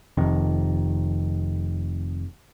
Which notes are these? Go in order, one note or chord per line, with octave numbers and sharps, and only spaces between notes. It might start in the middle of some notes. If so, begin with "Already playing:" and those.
F1 F2 D#3